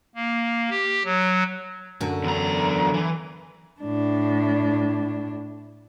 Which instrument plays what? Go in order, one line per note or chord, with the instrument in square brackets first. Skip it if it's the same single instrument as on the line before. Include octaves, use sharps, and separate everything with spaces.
[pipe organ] A#3
G4
F#3
[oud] F#2 D3
[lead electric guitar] E2 A#5
E3
[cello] A2 D4